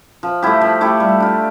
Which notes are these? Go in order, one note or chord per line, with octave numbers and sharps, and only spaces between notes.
F3
A3 E4 G4
F3
A3 E4 G4
G3
D4 F4